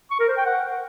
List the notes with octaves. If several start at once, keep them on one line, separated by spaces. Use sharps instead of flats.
C#6
A#4
C5
G5
F#5